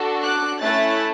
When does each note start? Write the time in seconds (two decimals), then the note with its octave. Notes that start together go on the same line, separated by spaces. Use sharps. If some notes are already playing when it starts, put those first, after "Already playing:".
Already playing: D4 F#4 A4
0.24 D6 F#6
0.62 A3 C#4 E4 A4 F#6 A6